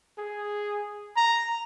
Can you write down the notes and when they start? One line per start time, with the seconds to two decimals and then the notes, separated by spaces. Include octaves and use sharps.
0.18 G#4
1.17 A#5